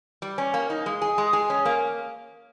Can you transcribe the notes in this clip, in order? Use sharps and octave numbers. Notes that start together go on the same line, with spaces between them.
G3
C#4
A#3
D#4
G#3
G#4
G#3
G#4
C#4
A#3